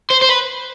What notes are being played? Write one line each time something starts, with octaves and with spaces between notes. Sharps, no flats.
C5
C5
B4